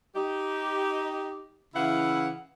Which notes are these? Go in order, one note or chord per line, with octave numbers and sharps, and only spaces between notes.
D#4 G4
C#3 E3 E4 F5 F#5